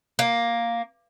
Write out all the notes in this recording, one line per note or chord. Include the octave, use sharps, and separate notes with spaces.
A#3